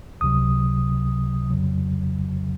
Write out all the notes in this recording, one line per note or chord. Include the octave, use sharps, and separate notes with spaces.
C#2 C3 F#3 D#6
F2 C#3 F#3